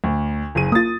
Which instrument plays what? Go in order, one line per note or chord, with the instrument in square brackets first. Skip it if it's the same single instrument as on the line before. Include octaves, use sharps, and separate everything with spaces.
[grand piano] D2
F#1 G#4 D#7
[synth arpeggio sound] A#3 F4 [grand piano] D#6 A6